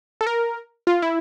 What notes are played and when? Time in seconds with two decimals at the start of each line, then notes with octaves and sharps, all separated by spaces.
0.21 A4
0.27 A#4
0.87 F4
1.02 E4